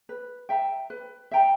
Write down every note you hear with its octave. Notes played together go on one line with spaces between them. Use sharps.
B4
E5 G5 A#5
B4
E5 G5 A#5